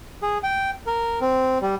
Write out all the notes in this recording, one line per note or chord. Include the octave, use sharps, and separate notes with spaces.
G#4
G5
A#4
C4
G3